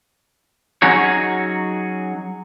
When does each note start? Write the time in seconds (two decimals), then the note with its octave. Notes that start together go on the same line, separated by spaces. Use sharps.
0.82 F#3 C#4 D#4 F#4 G#4 C#5